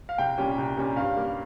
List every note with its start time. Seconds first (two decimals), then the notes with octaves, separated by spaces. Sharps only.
0.09 F5
0.18 C2 G5
0.38 A#2 G3 C#4
0.58 C2
0.77 A#2 G3 C#4
0.96 G2 F5
1.16 G3 A#3